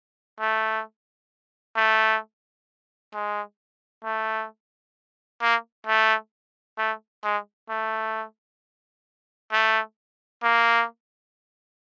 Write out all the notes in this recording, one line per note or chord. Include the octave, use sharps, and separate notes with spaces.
A3
A3
G#3
A3
A#3
A3
A3
G#3
A3
A3
A#3